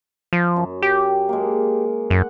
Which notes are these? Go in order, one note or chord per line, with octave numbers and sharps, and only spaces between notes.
F3
F#2
G4
G#3 A#3
F#2 F#5